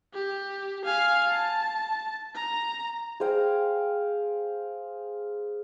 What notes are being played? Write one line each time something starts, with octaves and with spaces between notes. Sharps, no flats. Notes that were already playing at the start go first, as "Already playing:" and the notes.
G4
F5 G#5
A5
A#5
G#4 C5 F5 G5